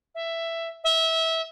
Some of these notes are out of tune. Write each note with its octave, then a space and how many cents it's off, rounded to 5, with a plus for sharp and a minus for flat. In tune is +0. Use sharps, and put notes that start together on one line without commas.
E5 +10
E5 -20